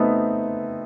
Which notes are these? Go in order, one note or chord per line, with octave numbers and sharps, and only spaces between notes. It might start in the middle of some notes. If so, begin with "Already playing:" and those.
Already playing: A3 B3 C4 D#4